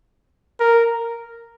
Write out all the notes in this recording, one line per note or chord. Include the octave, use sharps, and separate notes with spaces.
A#4